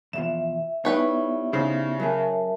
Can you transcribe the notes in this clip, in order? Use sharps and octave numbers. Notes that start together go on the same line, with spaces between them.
E2 B2 F3 E5 E7
G3 B3 D#4 E4 B4 C#5 E5
C#3 D#4 C5
F#3 C#4 G#4 A#4 E5 A5